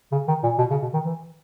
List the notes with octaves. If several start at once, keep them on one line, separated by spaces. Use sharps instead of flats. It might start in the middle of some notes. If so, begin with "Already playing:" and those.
C#3
D#3
A#2
B2
C#3
B2
D#3
E3